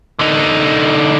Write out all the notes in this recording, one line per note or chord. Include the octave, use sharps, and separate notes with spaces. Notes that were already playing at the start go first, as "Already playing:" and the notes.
D3 D#4